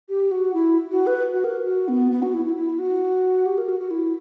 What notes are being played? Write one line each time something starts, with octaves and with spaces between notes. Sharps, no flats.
G4
F#4
E4
F#4
B4
F#4
A#4
F#4
B3
B3
F#4
E4
E4
E4
F#4
G4
A#4
F#4
F#4
E4